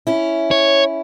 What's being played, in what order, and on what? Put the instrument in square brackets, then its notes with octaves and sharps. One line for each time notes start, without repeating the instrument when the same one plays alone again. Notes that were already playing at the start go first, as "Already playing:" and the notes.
[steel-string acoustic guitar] C#4 E4
[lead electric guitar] C#5